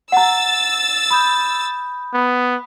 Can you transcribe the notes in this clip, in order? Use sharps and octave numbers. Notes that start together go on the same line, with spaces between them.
F#5 A#5 E6 A6
B5 D#6 G6
B3